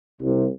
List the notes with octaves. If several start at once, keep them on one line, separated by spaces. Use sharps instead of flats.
C2 C3